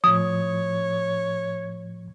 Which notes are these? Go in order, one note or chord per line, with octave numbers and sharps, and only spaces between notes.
A2 F3 C#5 D#6